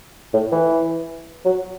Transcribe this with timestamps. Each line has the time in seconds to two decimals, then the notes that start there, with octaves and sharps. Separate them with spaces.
0.33 A2
0.52 E3
1.45 F#3